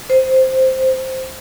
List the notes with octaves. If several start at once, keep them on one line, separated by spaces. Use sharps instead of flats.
C5